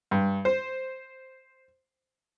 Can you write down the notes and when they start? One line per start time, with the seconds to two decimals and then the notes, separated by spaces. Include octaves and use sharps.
0.11 G2
0.45 C5